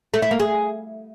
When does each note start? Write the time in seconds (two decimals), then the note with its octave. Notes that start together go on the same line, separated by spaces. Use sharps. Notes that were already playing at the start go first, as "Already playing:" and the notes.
0.14 A3
0.22 E4
0.31 A#3
0.40 G#4